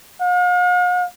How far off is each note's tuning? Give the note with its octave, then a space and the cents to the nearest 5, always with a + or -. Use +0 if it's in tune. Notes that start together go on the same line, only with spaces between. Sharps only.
F5 +45